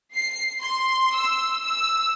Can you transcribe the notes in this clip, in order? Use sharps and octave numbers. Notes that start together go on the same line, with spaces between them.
C7
C6
E6
E6